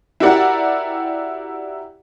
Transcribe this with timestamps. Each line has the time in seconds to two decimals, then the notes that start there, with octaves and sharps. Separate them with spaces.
0.20 E4 F#4 G4 A#4 D5 F#5